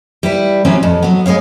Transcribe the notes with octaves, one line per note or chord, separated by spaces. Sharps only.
G3 E4 B4
F#2 A#2 E3 C4 C#4 B4
F2
F#3 B3
G#3 B3 C#5 F5